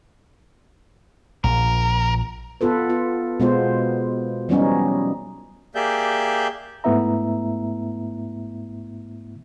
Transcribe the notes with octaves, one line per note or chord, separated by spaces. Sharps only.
A#1 F3 A#4
B3 F4 A4 B4
B3 F4
B2 G#3 B3 F4 C5
E3 F#3 G3 B3 C#4 D#4
A#3 G4 G#4 D5 E5 G6
G#2 A3 B3 E4 E5 A#5